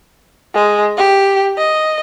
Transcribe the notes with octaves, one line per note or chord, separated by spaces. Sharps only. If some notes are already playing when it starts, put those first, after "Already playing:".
G#3
G4
D#5